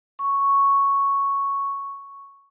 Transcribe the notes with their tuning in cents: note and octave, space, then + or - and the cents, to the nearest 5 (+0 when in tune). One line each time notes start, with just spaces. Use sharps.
C#6 +0